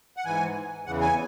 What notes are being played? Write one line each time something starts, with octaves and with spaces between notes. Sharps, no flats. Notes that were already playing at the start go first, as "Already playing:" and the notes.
F#5
G#2 E3 G#5
E2 C#3 E3 F#5
G#5